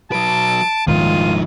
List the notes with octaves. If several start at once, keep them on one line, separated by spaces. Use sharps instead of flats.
F#3 B4 A5 D7
D#1 G#2 D#3 F3 G#3 F4 D#7